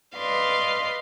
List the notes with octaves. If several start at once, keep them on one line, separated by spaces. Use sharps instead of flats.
B4 D5 D#5 F5 C6